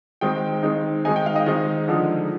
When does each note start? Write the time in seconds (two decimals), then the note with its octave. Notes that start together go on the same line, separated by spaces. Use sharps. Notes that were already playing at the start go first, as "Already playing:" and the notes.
0.21 D#3 G#3 C4 D#4 G5
0.63 D#3 G#3 C4 D#4
1.05 D#3 G#3 C4 D#4 G#5
1.16 G5
1.26 F5
1.36 D#5
1.46 D#3 G#3 C4 D#4
1.88 D3 F3 G#3 D#4